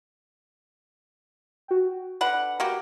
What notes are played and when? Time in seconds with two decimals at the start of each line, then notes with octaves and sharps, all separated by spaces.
1.68 F#4 G5
2.21 D3 B4 F#5 B5
2.60 A#3 F#4 G4